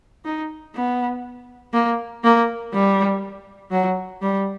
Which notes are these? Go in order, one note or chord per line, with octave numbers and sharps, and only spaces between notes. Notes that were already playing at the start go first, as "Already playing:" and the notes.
D#4
B3
A#3
A#3
G3
F#3
G3